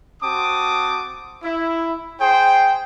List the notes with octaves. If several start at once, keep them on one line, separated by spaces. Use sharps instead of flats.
C4 F#4 A5 D6 D#6
E4
G#4 C5 G5